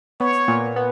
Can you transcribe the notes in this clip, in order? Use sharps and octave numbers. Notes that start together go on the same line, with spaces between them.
B3 C#5
A#2
B3